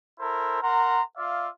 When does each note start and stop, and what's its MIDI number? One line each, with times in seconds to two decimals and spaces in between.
0.20 0.61 64
0.20 0.61 69
0.20 0.61 70
0.20 0.61 72
0.62 1.02 70
0.62 1.02 78
0.62 1.02 82
0.62 1.02 84
1.17 1.48 65
1.17 1.48 74
1.17 1.48 76
1.17 1.48 77